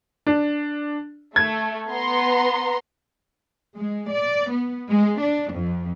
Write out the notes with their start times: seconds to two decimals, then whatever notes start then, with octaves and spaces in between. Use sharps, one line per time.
0.27 D4
1.36 A3 G#6
1.89 B3 A#5 C6
3.76 G#3
4.11 D5
4.51 B3
4.88 G#3
5.20 D4
5.52 F2